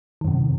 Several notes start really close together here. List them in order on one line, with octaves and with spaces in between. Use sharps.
D#3 F#2 C3